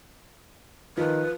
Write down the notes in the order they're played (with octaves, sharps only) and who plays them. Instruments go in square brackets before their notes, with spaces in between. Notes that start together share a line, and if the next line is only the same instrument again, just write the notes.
[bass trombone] D#3 [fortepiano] F3 [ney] B4